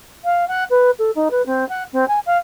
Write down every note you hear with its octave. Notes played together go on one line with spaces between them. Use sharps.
F5
F#5
B4
A4
D#4
B4
C4
F#5
C4
G#5
F5